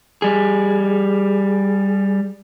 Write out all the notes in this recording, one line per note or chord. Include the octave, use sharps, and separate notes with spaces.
G3 G#4